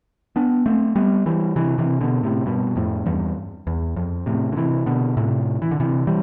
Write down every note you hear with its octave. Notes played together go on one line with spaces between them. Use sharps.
B3 D4
A3 C4
G3 B3
E3 G3
C3 E3
C3 E3
B2 D3
A2 C3
G2 B2
F2 A2
E2 G2
E2
F2
A2 C3
D3
C3 E3
B2 D3
A2 C3
E3
D3
C3 E3
E3 G3